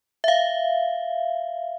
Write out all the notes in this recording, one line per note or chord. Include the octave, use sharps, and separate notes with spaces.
E5 F5